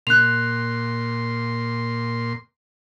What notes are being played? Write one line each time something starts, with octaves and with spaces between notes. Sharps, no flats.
A#2 C6 F#6 F7